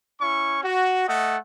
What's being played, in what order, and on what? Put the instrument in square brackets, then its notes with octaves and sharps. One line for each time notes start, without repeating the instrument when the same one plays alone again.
[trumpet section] C#4 E4 C#6
F#4
A3 D#5 F#5